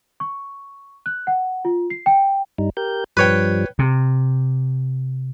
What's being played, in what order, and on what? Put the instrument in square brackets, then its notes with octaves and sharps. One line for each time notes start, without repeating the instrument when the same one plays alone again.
[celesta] C#6
F#6
F#5
F4
C7
G5
[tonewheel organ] G2 G3 D#4
G4 A#4 G6
[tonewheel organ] G2 F3 G3 [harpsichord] B4 C#5 G5
[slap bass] C3